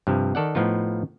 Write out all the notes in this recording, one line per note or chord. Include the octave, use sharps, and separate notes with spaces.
G2 C3 F3
D#3 A4 D5 F#5
A2 F3 B3 D#4 F4